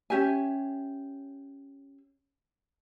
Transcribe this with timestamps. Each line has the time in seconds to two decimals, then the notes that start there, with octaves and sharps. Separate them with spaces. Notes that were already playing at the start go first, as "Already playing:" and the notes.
0.10 C#4 G4 E5 G#5